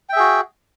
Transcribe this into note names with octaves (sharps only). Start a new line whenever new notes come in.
F#4 G#4 E5 G5